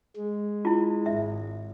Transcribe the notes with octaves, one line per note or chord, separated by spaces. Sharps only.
G#3
E4 F4
G#1 E5